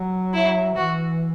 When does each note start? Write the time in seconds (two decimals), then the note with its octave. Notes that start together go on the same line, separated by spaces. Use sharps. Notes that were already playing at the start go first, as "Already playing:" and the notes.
Already playing: F#3
0.34 E4
0.76 E3 F#4